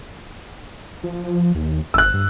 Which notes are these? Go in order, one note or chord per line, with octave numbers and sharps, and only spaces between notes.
F3
D#2
G1 E6 F#6
G2